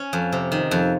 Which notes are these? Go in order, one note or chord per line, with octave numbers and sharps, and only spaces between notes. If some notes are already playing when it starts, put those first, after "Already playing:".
Already playing: C#4
F2
C3
D#3
F2